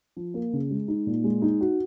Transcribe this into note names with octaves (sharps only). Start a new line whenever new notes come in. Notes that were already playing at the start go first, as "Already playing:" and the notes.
F3
A#3
C#3
G#3
D#4
A#2
G#3
D#4
F#4